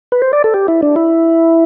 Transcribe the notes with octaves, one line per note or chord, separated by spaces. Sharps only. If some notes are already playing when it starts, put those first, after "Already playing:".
B4
C5
D5
A4
G4
E4
D4
E4